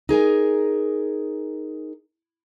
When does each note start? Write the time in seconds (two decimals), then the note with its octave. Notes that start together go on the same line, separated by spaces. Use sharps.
0.09 D#4 G#4 A#4 G#5